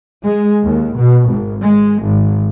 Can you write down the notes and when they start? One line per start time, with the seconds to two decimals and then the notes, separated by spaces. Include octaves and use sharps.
0.23 G#3
0.64 D#2
0.96 B2
1.28 G#1
1.63 G#3
2.03 G#1